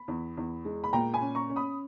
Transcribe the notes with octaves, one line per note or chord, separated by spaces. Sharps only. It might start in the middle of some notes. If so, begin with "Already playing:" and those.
Already playing: B5
E2
E2
G#3
B5
A#2 G5 A#5
G#5 B5
C#4
A#5 C#6
C#4
B5 D#6